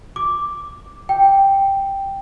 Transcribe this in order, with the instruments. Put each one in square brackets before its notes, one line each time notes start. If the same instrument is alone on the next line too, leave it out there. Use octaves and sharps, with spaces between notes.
[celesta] D6
G5